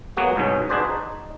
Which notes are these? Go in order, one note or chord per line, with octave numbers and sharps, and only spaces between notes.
F#3 A#3 B3 F#4 G#4
C2 G#2 B2 C#4
D4 F#4 G#4 B4 C5 D5
D#4